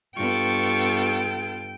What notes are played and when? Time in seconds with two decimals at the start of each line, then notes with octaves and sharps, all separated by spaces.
0.17 G2 B3 F4 A4 G5 C#6